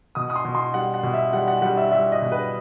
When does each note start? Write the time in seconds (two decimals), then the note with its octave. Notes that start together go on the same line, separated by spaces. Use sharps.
0.15 B2 D#6
0.30 D#6
0.36 C6
0.45 B2
0.55 C6
0.74 G3 F#5
0.94 F#5
1.03 B2
1.13 E5
1.33 G3 F#5
1.48 F#5
1.62 G3 F#5
1.77 E5
1.92 G3 E5
2.12 D#5
2.22 B2
2.32 B4